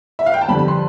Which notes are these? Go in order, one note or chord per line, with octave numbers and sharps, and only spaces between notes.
E5
F5
G5
A5
F2 D3 G3 B5
B5
C6